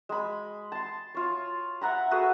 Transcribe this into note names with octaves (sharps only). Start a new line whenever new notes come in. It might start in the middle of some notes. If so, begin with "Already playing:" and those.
G#3 B5
A5 C6
F4 C#5
E5 F#5 A#5 B5
F#4 G#4 A4 B4